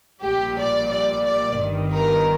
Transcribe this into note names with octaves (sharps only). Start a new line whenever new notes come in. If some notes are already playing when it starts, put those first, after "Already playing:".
A#1 A#2 G3 G4
D5
D5
D5
G1 G2 D#3
A#4